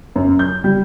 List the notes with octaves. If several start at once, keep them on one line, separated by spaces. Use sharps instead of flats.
F#2
G6
G3